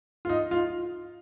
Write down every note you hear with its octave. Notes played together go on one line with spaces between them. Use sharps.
F4
D#4
F4